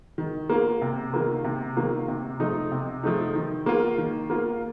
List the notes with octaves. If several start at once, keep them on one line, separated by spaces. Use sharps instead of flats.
D#3
A#3 F4
C3
D#3 A#3 F4
C3
D#3 A#3 F4
C3
F3 A3 D#4
C3
F3 A3 D#4
D#3
A#3 F4
D#3
A#3 F4